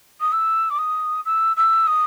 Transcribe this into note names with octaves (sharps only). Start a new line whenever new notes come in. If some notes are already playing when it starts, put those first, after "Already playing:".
D#6
E6
D6
D#6
E6
E6
D#6